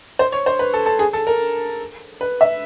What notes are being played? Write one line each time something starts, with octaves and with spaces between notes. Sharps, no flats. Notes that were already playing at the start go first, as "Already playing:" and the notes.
C5
C#5
C5
B4
A4
A4
G#4
A4
A#4
B4
E5